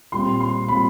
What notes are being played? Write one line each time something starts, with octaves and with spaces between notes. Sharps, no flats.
A#2 G3 C4 C6
C6
A#2 G3 C4 B5